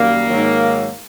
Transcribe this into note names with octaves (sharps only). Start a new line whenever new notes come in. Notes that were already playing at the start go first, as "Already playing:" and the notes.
Already playing: F#2 D#3 G3 A#3
G#2 D#3 F#3